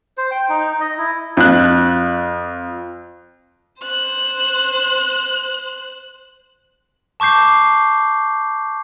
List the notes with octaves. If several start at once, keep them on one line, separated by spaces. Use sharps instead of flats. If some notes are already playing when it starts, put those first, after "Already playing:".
C5
G5
D#4
D#5
E4
F2 F#6
C5 F#6
A5 C#6 D6 G6 C7